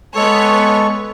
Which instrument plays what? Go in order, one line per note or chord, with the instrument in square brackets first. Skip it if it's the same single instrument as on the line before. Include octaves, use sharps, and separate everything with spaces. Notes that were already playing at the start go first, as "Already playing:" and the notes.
[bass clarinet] G#3 [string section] B3 C#5 [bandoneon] A4 C#6